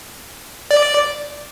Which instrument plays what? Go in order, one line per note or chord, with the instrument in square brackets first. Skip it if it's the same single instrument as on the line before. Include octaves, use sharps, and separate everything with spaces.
[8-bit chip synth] D5